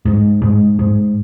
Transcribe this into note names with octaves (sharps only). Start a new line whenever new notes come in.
G#2
G#2
G#2